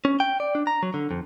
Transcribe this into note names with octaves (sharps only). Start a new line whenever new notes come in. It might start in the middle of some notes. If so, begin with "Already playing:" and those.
C#4
G5
D5
D4
A#5
F#3
D3
F2